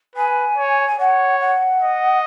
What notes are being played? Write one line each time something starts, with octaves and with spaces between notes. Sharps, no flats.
B4 G#5
C#5
G#5
C#5 F#5
F#5
D#5